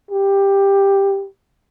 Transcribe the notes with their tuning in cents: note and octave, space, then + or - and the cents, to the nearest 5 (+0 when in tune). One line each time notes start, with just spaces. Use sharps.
G4 +10